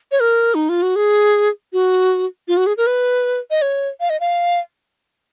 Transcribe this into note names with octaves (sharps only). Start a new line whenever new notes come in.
C#5
A#4
D#4
F4
F#4
G#4
F#4
F4
F#4
G#4
A#4
B4
D#5
C#5
F5
D#5
F5